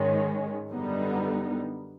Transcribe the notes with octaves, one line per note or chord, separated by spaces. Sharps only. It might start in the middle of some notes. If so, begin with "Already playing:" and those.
Already playing: G#2 D#3 G#3 C#4
F#2 D3 G3 B3 D#4